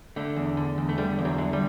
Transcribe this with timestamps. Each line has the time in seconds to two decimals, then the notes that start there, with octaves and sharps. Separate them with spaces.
0.16 D3 A3
0.36 E2
0.57 D3
0.78 E2
0.89 A3
0.98 D3 G3
1.19 E2
1.25 F#3
1.38 D3
1.53 G3